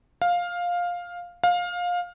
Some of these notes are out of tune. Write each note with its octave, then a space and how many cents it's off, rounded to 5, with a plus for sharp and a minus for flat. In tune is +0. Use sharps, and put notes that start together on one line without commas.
F5 +10
F5 +20